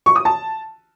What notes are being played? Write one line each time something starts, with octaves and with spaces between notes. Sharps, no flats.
C#6
D#6
A5